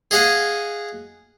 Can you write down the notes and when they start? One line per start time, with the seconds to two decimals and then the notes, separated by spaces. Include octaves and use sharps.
0.11 G#4 D#5 F5 F#5 G#5